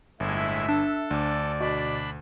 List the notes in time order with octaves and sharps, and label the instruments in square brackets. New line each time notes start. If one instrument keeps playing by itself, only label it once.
[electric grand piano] G1 [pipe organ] A2 G#3 E4 [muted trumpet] E5
[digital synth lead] D4 [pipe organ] A4
[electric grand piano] D2 [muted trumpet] D5
[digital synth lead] B2 [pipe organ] D4 B5